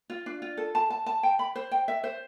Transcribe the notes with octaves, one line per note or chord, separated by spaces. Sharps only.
F4
D4
F4
A4
A5
A5
A5
G5
B5
C5
G5
E5
C5